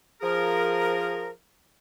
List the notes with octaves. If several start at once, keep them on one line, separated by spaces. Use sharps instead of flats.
F3 G#4 A#4